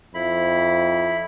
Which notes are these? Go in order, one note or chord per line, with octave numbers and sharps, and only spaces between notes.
F2 E4 B5